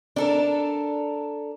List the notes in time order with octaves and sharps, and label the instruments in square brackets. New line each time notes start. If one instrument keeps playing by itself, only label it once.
[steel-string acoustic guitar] D4 A4 A#4